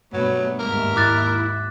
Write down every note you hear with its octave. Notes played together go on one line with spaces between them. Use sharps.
G2 B2 F#3 A3 B3
D#2 G#2 A#4 E5
E4 D6 F#6 A6